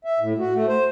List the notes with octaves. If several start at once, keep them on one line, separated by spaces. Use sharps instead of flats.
E5
A2
F#4
A3
C5